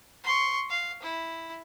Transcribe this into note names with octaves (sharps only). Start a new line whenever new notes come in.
C6 C#6
F5
E4